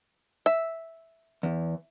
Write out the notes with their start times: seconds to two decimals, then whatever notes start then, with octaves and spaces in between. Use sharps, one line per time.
0.46 E5
1.43 E2